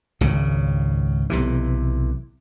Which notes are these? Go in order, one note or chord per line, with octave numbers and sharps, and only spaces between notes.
G#1 C#2 C#3
B1 C3 E3